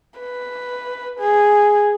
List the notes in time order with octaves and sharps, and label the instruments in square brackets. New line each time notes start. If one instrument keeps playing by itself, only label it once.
[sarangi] B4
G#4